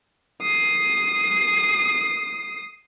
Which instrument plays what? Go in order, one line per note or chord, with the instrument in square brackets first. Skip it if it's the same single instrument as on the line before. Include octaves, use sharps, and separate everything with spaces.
[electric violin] D#6 C7